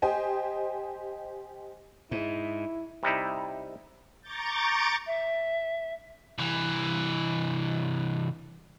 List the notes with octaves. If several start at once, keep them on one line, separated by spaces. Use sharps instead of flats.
G4 C5 D#5 G5 G#5
G#2 E4
C3 G3 D#4 E4
A#5 C#6 D6 G6 A6
E5
C2 E3